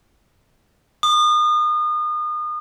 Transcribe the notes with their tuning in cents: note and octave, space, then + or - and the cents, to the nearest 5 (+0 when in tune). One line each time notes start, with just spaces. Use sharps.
D#6 -35